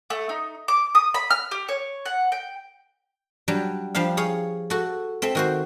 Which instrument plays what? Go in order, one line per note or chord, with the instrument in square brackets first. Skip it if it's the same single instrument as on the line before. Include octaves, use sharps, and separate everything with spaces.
[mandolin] A3
D#4
D6
D#6
B5
F6
G4
C#5
F#5
G5
[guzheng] F#3 G3 D4
F3 G3 D4 F5
G#4 C#5 F5
F#4 A4
C4 A4 E5
D#3 F#4 C5